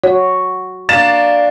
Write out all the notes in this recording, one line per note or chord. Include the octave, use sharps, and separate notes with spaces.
F#4 C#5
A#3 D4 A6 E7